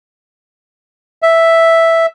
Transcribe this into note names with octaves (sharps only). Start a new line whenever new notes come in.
E5